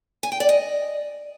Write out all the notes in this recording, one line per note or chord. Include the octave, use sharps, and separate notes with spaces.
G#5
G5
D5
D#5